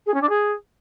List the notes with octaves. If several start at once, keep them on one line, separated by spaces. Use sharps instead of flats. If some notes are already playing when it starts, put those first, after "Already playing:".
G#4
C#4
D4
G#4